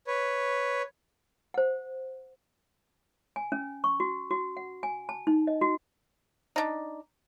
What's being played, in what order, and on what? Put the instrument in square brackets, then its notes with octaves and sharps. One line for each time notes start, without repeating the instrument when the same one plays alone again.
[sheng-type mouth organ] B4 C#5
[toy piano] C5 F#5
G#5
C#4
C#6
F#4
F#4
F#5
G#5
A5
D#4
D#5
F#4
[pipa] D4 D#4